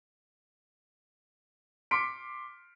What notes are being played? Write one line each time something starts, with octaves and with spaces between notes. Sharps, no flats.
C6 D6 F6 B6 C#7 D7